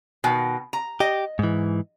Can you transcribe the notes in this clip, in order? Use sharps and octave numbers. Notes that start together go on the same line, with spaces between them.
B2 D#3
A#5
G4 D#5
G#2 E3